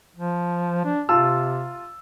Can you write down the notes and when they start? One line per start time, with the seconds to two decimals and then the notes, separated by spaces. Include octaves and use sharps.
0.16 F3
0.85 D4
1.09 C3 F4 A5 E6